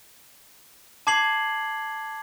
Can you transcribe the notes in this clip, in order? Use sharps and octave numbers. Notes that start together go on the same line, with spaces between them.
A5 D6 G#6 C7 F#7